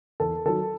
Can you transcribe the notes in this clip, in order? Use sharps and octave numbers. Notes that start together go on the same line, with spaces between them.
E2 A4
D#3 F#3 A4